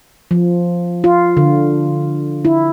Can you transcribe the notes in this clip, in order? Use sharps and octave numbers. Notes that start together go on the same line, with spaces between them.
F3
F4
D3
E4